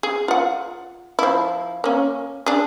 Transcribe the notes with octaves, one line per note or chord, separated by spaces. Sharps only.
G#4
F4 F#5
F3 E4
A#3 C#4
D4 G#4